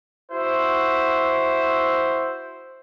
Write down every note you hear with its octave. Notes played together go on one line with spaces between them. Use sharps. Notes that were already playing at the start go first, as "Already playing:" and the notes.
E4 F#4 C5